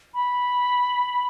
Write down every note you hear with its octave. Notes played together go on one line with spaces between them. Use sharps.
B5